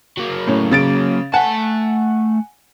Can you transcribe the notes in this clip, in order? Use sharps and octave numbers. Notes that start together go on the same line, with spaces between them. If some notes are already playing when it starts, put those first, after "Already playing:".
F#3 A#3
A2 C#4
C#3 A6 D7
A3 F#5 G#5 A5